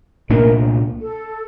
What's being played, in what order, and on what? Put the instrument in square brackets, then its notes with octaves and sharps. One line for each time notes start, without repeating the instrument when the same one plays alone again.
[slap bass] C2 A#2 A3 D4 [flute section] A#4
[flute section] A4